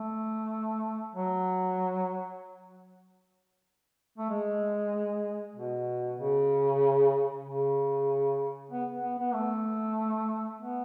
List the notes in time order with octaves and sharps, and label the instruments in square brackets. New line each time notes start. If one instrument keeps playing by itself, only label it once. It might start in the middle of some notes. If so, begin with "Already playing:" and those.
Already playing: [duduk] A3
F#3
A3
G#3
B2
C#3
C#3
B3
B3
B3
A3
B3